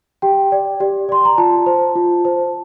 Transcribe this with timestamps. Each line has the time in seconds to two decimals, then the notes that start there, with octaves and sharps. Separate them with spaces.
0.22 G4 G5
0.52 D5
0.80 G4 D5
1.09 D5 C6
1.25 A#5
1.38 F4 A5
1.66 C5
1.96 F4
2.25 C5